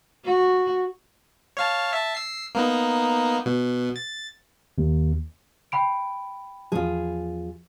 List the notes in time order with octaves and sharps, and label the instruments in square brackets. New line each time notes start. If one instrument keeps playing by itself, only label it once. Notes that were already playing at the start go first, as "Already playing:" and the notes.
[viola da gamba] F#4
[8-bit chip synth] C#5 F5 A5
E5 A5
E6 C7
A#3 B3 D#4
B2
A6
[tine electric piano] D#2
[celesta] G5 B5 D7
[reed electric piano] E2 F3 [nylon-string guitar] F4 G#4